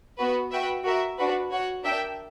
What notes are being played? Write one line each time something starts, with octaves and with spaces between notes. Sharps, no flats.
B3 F#4 B4
F#4 B4 E5 G5
F#4 A#4 E5
D4 F#4 B4
F#4 C#5 F#5
D4 A#4 E5 G5